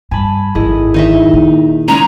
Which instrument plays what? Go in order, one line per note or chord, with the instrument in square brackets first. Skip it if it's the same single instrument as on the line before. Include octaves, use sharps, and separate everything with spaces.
[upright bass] G2 [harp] G#5 A5 B5
[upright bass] G#1 F#2 [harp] E4 G#4 D#5
[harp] D#3 [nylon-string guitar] D#4 D#5 E5
[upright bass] A#2
[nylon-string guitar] C#3 G#3 C#4 [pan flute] A#5